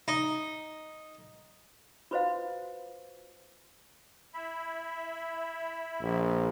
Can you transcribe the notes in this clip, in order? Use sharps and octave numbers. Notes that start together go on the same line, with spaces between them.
D#4
F4 F#4 B4 C5 D#5 F5
E4 E5 B5
A#1